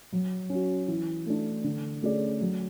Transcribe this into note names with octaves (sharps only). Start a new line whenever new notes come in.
F#3
C#4 F#4
E3
A3 D4
D3
A3 C#4 G#4 D5
F#3